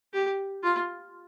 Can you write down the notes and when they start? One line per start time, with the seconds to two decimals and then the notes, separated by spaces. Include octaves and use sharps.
0.13 G4
0.63 F4